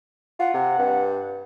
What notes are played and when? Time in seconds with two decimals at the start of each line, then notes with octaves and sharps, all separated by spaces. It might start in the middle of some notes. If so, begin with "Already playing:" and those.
0.40 F4 F#5
0.54 C3
0.78 G2